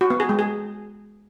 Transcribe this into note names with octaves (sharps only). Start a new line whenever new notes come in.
F#4
B3
G#4
G#3
G#4